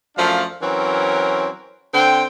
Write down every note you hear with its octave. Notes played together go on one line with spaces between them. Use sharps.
F#2 F3 A3 D4 F5
E3 F#3 C4 C#4 A#4
D3 C4 G5